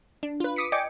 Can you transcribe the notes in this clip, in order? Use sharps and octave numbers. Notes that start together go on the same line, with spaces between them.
D4
F4 B4
D6 D#6 B6 C#7
D5 D#5 G5 G#5 D6 C#7